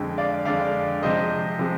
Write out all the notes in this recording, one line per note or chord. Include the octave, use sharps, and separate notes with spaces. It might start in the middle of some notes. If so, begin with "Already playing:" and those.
Already playing: F2 D3 G#3
D5 F5
F2 D3 G#3 D5 F5
C3 F3 G#3 C5 D#5
C3 F3 G#3